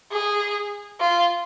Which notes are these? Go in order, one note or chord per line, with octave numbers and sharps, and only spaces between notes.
G#4
F4